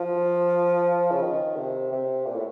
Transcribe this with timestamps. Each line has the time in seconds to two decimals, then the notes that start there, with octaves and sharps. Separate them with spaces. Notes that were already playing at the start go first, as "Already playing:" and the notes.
Already playing: F3
1.12 C#3
1.22 D#3
1.56 C3
1.92 C3
2.26 A#2
2.35 A2